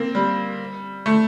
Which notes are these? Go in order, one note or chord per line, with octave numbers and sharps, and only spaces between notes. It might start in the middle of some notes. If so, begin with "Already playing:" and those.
Already playing: A#3 C4
G3
A3